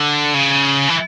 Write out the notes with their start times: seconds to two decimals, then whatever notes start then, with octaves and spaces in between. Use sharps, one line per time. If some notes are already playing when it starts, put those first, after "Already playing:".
Already playing: D3
0.34 C#3
0.89 E3